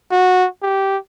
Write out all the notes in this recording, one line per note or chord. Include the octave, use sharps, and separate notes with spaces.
F#4
G4